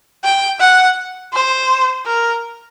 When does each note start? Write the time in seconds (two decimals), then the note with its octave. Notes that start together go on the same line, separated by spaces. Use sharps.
0.24 G5
0.60 F#5
1.33 C5
2.06 A#4